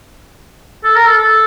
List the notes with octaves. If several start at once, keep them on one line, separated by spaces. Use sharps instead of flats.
A4
A#4
A4
A4